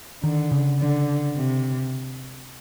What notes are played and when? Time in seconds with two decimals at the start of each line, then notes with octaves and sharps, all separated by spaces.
0.24 D3 D#3
0.52 C#3
0.80 D3
1.36 C3